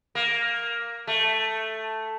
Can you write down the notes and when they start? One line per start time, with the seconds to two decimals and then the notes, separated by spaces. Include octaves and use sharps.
0.15 A#3
1.07 A3